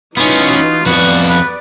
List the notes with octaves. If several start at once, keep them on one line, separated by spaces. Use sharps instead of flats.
E3 B3 C#4 D#4 F4 F#4
F2 B3 F#4 B4 D5
B4